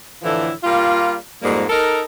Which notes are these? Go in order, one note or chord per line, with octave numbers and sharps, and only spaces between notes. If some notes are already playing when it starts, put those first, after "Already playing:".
A2 D3 E3 F3 E4
G3 A#3 F4
F2 G#2 G3 A#3
D#4 A4 A#4